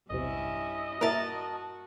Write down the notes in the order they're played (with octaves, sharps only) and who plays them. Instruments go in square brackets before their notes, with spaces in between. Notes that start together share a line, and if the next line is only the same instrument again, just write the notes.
[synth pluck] B1 E2 C3 [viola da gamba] G2 C#4 E4 [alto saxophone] D#5
[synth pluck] A#3 E4 E5 [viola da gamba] F#4 [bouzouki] A#4 A5